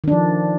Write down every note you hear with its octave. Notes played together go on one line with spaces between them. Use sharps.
D#3 F3 D4